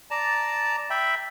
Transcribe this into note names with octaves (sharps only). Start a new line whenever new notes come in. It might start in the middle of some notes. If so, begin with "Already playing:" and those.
D5 A5 A#5
E5 G5 B5